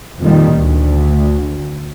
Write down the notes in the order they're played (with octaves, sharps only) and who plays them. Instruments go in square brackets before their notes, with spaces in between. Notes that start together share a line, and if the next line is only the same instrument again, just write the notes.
[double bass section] F2 A#2 D#3 G3
D2